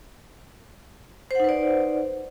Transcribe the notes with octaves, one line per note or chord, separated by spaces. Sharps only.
D#4 B4 C5 D5 F#5